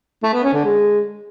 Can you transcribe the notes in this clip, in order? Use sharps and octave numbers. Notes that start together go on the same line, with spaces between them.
A3
B3
C#4
D3
G#3